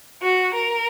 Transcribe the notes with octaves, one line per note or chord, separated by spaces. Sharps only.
F#4
A#4